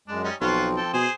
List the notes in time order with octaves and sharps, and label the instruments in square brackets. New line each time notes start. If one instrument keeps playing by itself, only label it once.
[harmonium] F#2 G#3 [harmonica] D4
[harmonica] G3 C#4 D#4
[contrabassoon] B1 [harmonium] F3 C4 [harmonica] F4 F#4 F5
[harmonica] A4 G5
[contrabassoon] B2 [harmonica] G#4 C5 G#5